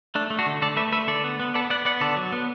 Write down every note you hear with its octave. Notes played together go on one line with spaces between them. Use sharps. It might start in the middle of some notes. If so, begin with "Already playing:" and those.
A3 D4
A3
D4 F#4
D3
D3 A4 D5
A3 B4 E5
A3 B4 E5
D3 A4 D5
B3
B3
B3 A4 D5
B3 D5 F#5
B3 D5 F#5
D3 A4 D5
F#3
B3